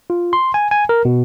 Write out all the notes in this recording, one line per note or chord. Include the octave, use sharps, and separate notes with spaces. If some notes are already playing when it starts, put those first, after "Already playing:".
F4
C6
G#5
G#5
A#4
B2